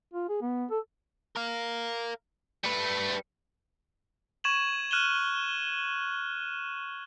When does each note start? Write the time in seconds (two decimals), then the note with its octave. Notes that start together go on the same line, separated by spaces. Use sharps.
0.14 F4
0.29 G#4
0.42 B3
0.70 A4
1.36 A#4 F5
2.64 G3 A3 B4
4.44 C#6 G#6 D#7 E7 F#7
4.91 F6 F#6 D#7 E7 F#7 G7